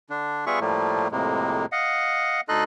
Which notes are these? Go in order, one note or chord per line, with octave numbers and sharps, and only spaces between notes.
D3 D4
G3 B3 F4 G#4 E5 C#6
A2 F3 G3 A3 A#3
F2 A2 C3 G#3 A#3
D#5 F5 F#5
D2 D#4 A4 D#5 C6 F#6